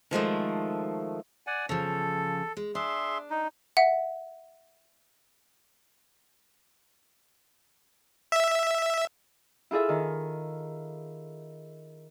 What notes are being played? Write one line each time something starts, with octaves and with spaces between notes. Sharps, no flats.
D#3 F3 G#3 A3
D5 F#5 G#5
C#3 F3 A4
G#3
D4 G#4 E5 C6
D#4
E5 F#5
E5
E4 F4 G#4 A4 E5
D#3